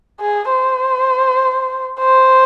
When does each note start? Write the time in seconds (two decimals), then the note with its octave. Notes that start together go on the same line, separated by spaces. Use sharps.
0.20 G#4
0.50 C5
2.00 C5